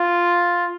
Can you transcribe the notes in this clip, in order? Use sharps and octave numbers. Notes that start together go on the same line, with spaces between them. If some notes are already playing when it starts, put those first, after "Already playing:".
Already playing: F4